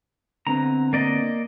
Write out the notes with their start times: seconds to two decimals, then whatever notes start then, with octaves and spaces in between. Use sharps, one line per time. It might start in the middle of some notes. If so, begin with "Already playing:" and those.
0.47 D3 B3 C4 A#5
0.93 A#3 D5 D#5